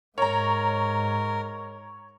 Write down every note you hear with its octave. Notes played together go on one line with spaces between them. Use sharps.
G#2 A#4 C#5 A#5